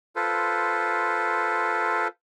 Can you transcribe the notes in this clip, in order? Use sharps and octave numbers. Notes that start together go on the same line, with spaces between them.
F4 A4 B4 C5